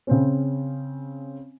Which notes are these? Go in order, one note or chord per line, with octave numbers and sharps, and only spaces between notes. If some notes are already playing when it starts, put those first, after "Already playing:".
C#3 C4 C#4